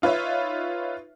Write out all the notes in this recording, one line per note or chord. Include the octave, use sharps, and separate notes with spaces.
D#4 F4 B4 C#5 E5